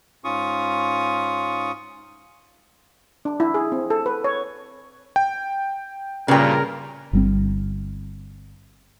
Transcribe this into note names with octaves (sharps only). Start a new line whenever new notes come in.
G#2 C#4 F4 C#6 D#6
D4
E4
G#4
C4
A4
B4
C#5
G5
G2 A#2 C#3 A#4 G5
G1 G3 C4